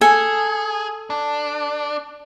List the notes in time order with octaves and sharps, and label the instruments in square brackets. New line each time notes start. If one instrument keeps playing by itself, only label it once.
[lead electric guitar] G#4 [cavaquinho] A4 G#5
[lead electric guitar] D4